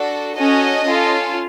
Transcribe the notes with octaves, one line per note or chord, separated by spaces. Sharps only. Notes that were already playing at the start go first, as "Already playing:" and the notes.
Already playing: D4 F#4 A4
C#4 F#4 A4 D#5
C#4 F4 A4